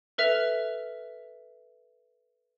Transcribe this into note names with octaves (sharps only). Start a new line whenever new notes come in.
A4 B4 E5 F6 F7